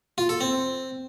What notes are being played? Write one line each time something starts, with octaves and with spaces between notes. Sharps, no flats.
F4
A4
C4